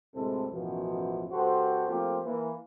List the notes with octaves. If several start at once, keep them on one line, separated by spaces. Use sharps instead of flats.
D2 A2 C3 G#3 C4 A4
A1 F#2 B2 E3 F3
C#2 F#4 G4 A4 C5
F3 A3 A#3 C4 F4 G4
E3 A#3